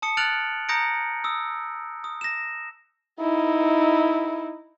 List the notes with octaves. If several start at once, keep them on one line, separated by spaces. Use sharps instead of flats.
A5 D#6 C#7
F6 F#6 A6 D7 F7 F#7
A#5 D#6 G6 A#6 C#7 D7
D#6 E6
D#6
A#6 E7
D#4 E4